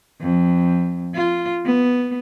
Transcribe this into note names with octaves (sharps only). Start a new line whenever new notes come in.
F2
F4
B3